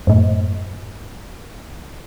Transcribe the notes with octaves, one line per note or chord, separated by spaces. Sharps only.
F#2 A2